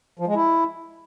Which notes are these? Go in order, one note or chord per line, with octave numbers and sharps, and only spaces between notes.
F3
G#3
E4